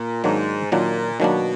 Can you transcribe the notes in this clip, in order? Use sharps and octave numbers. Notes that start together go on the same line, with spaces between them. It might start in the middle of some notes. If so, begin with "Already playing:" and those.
Already playing: A#2
G#2 D#3 F#3 A#3 D4
A#2 D#3 F#3 A#3 D4
B2 D#3 F#3 A#3 D4